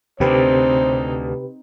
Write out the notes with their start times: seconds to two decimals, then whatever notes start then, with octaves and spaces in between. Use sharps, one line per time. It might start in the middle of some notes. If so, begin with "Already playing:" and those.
0.20 D2 C3 C4 D#4 G4 B4 C5